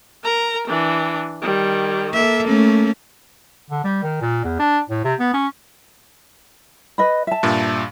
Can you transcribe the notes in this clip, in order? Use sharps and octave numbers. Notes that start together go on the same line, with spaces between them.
A#4 A#5
E3 D4
D#3 G3
A#3 A4 E5
A3 C#4
D3
G3
D#3
A#2
E2
D4
A2
C3
B3
C#4
B4 D#5 B5
E5 A5
G2 A#2